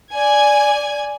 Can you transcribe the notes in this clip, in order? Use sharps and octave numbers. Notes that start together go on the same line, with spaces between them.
D5 G#5 G#6